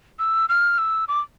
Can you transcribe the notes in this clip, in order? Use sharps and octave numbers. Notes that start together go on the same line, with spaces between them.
E6
F6
E6
D6